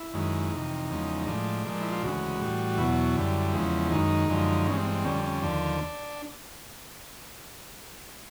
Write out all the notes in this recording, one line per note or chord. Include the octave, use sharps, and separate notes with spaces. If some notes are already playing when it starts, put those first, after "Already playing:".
Already playing: E4
F#2 D#3 G#3
F2 C3 E3 D#4
E2 C#3 F3 G#3
A2 F3 G#3 D4
A#2 F3 G#3
E4
F4
D2 C#3 E3 G#3 F#4
A2 E3 G3
E2 B2 F#3 E4
F#2 D3 G3
E2 C#3 F3 G#3
F#2 D#3 G#3 D#4
F#2 D3 F3 G#3
G2 E3 G#3 C#4
C4
C4
F2 D3 G3 C#4
C#4
D#2 D3 F3 D4